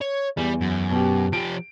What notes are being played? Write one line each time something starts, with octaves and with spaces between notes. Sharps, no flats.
C#5
E2 G3
F#2
B2 G4
F3 G4 D7